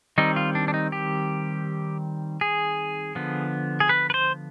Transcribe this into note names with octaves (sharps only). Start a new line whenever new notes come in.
D#3 G3 C4 D#4
F4
D4
D4
D#4
G4
G#4
D3 F3 B3
G#4
B4
B4
C5